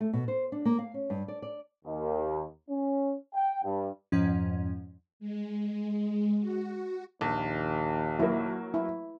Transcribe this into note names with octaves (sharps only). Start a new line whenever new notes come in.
A3
B2
C5
D4
A#3
F5
C#4
G2
D5
D5
D#2
C#4
G5
G2
F2 G#2 F3 C#4
G#3
F#4
A#1 D#2
F#3 A#3 E4
E4